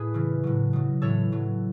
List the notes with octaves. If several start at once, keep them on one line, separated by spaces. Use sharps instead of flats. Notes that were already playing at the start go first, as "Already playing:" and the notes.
Already playing: A2 G#4 B4
C#3 E3
A2 F#3
B2 F#3
A2 E3 A4 C#5
A2 F#3